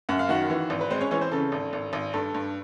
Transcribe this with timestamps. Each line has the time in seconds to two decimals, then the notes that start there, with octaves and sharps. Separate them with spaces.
0.09 F#2 F#5
0.19 F5
0.29 D#3 F#4 F#5
0.50 E3
0.70 G#1
0.81 B4
0.90 G#3 C4 C5
1.01 C#4 C#5
1.11 E3 C#4 C#5
1.21 C4 C5
1.32 C#3 A4
1.52 G#1
1.73 G#1
1.93 G#1
2.14 G2 A4
2.34 G2